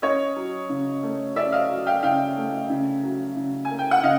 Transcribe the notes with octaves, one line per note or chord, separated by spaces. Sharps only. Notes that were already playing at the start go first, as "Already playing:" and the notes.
C#4 C#5 D#5
F#3
C#3
A3
C#4 D5 E5
D#5 F5
F#3
F5 G5
C#3 F5 G5
A3
C#3
F#3
C#3
A#3 G#5
G5
F#5
C#3 D#5 F5